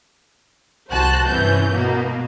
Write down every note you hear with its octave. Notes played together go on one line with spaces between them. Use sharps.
C2 F#4 C5 A5 F#6
G2 C3 E3 C#4 G6
B2 A#3 B3